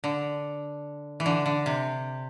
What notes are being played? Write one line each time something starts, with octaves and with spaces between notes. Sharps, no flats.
D3
E3
D3
D3
C3